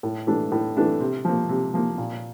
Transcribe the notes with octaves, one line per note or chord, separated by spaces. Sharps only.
A2
E3 A3 D4
A2
E3 A3 D4
C3
F3 A#3
C3
F3 A#3
A#2